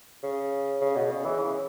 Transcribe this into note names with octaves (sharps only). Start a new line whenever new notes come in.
C#3
C#3
B2
C#3
E3
C#3